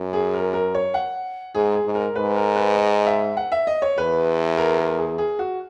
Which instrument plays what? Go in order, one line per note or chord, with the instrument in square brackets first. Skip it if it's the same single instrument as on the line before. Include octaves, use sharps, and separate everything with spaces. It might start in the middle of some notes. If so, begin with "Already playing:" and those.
Already playing: [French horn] F#2
[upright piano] G#4
A#4
A#4
C#5
F#5
[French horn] G#2 [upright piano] G#4
[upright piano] G#4
[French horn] G#2
[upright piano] A#4
[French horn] G#2 [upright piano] B4
[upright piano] A#4
B4
D#5
E5
F#5
E5
D#5
C#5
[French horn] E2 [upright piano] B4
[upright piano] A#4
A#4
G#4
G#4
F#4